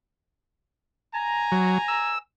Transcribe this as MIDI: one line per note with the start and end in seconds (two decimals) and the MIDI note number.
1.15 2.17 80
1.15 2.17 82
1.52 1.78 54
1.88 2.18 88